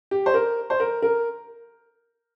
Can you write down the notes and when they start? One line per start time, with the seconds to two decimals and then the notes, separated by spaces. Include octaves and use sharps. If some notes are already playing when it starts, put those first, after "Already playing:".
0.11 G4
0.26 C5
0.34 A#4
0.70 C5
0.80 A#4
1.02 A#4